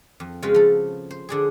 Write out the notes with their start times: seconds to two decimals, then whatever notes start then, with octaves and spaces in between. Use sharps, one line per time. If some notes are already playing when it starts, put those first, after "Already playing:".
0.20 F2
0.42 C#3 G#3 F4 F#4 B4
0.54 F3 A4
1.11 C5
1.29 D3 D4 G#4